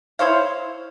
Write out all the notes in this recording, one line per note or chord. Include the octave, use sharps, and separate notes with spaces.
E4 C5 C#5 F5